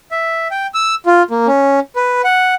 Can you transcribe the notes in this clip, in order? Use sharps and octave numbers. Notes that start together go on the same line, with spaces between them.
E5
G5
E6
F4
A#3
C#4
B4
F#5